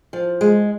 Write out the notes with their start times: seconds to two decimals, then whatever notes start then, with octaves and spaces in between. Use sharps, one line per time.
0.13 F3
0.41 G#3